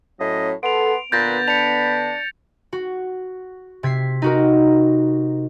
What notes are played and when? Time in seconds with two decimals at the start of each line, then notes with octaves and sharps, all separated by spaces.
0.20 A2 F#3 C#4 D#5
0.63 B3 A4 C6 D7 F7
1.12 A#2 D3 B3 B4 G6 A6 A#6
1.48 D4 B5 C#7 F7
2.73 F#4
3.83 C3 G#6 B6 C7
4.22 D#4 F#4 A#4